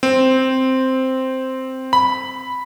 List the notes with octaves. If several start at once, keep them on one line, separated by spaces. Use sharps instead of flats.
C4
B5